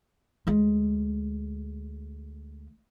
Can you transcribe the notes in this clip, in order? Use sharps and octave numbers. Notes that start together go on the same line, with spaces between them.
D2 G#3